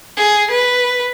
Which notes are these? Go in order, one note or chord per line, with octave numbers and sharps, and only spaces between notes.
G#4
B4